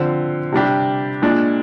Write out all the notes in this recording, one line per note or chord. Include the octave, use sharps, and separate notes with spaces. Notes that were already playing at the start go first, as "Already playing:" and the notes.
Already playing: D3 F3 C4
C3 G3 D4 G4
A#2 G#3 D4